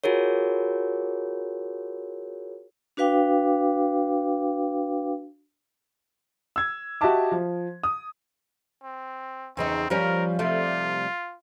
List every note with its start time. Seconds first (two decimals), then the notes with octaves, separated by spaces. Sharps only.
0.04 F4 F#4 G#4 A#4 C#5
2.97 D4 F#4 B4 F5 G5 D6
6.56 E6 G#6
7.01 F#4 G4 D#5 E5 A5 D6
7.32 F3
7.83 D#6
8.83 C4
9.57 E2 C#3 C4 D#4
9.90 F3 G3 C#4 A#4
10.39 C3 G3 A3 F4